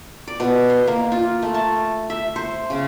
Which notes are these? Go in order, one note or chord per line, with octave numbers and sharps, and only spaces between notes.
D5
B2
C6
A#3
F4
A3
A5
E5
C5
C#3